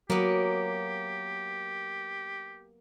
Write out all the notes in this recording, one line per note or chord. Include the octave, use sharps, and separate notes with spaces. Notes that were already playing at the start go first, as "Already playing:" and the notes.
F#3 A#3 B3 G4